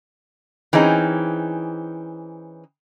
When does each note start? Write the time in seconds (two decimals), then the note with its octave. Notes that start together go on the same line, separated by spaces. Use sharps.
0.73 E3 C4 C#4 D#4 G#4